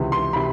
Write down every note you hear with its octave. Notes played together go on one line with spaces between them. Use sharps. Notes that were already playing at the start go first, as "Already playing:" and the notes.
Already playing: C#2 C3 E3
C6
C3 B5